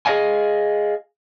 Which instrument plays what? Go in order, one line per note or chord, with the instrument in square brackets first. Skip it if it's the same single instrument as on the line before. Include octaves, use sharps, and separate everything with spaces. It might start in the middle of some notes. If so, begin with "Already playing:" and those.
[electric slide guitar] G#4 C5 D#5 F5 G#5